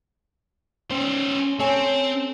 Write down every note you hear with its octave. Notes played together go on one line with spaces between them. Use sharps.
C#4 C5
C4 A4 C#5 G#5